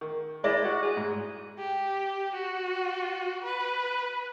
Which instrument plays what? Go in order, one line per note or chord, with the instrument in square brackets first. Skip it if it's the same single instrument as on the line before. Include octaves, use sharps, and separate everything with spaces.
[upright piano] D#3
[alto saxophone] G#3 [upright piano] E4 D5
[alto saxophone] F#4
G#4
[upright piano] G#2
[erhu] G4
F#4
B4